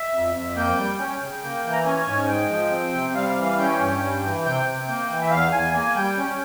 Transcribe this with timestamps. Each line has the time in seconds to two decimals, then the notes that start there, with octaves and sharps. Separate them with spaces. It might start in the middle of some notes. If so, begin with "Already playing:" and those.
Already playing: E5
0.13 F2
0.34 F2
0.55 A#3 G5
0.77 G3
0.98 C#4
1.21 C#3
1.42 A#3
1.64 E3
1.73 A#5
1.85 C#4 G#5
2.06 G#2 G#5
2.28 G#3 G5
2.50 F3
2.71 C4
2.94 C3
3.14 G3 F5
3.30 F5
3.37 E3
3.43 F5
3.58 C#4 G5
3.80 G2
4.01 G3
4.23 E3
4.45 C3 G5
4.66 C3
4.88 A#3
5.10 E3
5.22 E5
5.30 E2 F5
5.52 E2 G#5
5.73 A#3 G#5
5.95 G3 G5
6.17 C#4